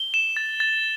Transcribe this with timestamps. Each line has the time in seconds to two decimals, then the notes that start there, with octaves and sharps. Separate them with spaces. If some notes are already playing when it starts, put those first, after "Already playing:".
Already playing: G7
0.14 E7
0.37 A6
0.60 A6